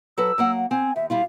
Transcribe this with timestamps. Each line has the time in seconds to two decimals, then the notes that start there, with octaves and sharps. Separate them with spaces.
0.18 F#3 A4 B4 E6
0.38 F#3 A#3 F#5
0.71 C4 G#5
0.96 D#2 E5
1.10 G3 E4 F4 F5